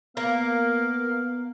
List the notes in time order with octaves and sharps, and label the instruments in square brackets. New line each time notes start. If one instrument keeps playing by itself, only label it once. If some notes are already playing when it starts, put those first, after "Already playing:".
[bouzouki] A#3 [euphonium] B3 [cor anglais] F5